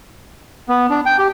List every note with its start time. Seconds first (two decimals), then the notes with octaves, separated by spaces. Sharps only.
0.69 B3
0.90 D4
1.06 G5
1.19 G4